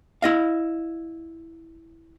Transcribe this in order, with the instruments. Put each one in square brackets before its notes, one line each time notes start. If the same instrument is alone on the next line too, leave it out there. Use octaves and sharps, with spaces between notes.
[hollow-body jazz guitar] E4 D#5 F5